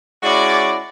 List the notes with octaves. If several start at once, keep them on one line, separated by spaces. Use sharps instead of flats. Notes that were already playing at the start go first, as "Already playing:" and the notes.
G#3 C#4 E4 F#4 D5